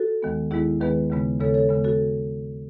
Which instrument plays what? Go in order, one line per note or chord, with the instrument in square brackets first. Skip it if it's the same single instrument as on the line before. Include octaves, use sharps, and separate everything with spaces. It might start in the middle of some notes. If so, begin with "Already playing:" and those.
Already playing: [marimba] F#4 A4
D#2 D#3 G#3 B3
D#2 D#3 G#3 B3 E4 G#4
D#2 D#3 G#3 B3 G#4 B4
D#2 C#3 G#3 B3
D#2 C#3 G#3 B3 A4 C#5
A4 C#5
D#2 C#3 G#3 B3
F#4 A4